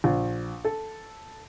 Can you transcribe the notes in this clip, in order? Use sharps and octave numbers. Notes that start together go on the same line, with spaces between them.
A#1
A4